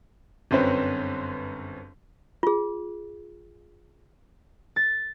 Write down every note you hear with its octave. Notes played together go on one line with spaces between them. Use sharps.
G1 F#2 C4 C#4 B4 C5
F4 G#4
A6